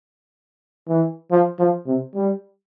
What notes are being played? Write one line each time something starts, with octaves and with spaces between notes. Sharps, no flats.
E3
F3
F3
C3
G3